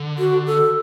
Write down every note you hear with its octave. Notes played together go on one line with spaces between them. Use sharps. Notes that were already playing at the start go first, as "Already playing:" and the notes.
Already playing: D3
F#4
A4